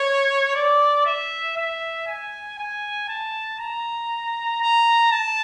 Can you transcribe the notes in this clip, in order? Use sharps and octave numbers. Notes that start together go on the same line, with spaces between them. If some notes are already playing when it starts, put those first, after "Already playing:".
Already playing: C#5
D5
E5
E5
G#5
G#5
A5
A#5
A#5
A5